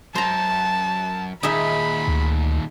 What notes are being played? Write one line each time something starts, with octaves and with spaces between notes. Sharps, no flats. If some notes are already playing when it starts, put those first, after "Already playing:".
F#2 C5 A5 A#5
D#2 A#2 D#4 G#4 E5 B5
D2